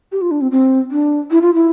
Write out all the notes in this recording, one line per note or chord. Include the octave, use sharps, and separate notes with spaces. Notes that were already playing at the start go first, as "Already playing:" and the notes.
G4
F4
D4
C4
C4
D4
E4
F4
E4